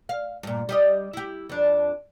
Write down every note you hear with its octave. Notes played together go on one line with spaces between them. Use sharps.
F5
G2 A#2
G3 G4 D#5
E4 G4
F2 D4